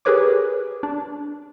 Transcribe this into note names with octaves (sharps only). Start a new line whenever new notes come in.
G4 G#4 A#4 B4 C#5 D6
D4